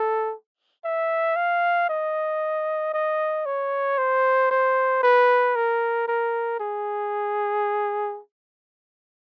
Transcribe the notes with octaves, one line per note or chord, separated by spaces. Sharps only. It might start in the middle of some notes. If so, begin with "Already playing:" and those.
Already playing: A4
E5
F5
D#5
D#5
C#5
C5
C5
B4
A#4
A#4
G#4